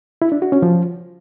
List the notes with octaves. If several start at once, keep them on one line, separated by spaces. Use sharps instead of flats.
E4
D4
F#4
C#4
F3